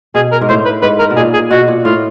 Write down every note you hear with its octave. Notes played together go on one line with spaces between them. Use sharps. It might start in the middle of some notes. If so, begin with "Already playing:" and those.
B2 G#4
A#4
G#2
A2 C5
B4
G#2 B4
A#4
B2
A#2 G#4
G#4
B2 F#4
A#2
A2 F4